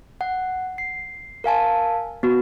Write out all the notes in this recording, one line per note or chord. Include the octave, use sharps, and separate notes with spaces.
F#5
C7
A#4 F5 G#5 A5
B3 F#4